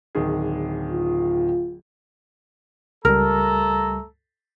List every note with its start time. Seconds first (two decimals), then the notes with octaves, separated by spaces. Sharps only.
0.15 D1 D#3 G#4
0.92 F4
3.05 C#2 G3 A3 A4 A#4 A#5